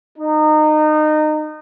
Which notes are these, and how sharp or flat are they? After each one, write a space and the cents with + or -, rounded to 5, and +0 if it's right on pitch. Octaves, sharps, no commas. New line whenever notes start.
D#4 -25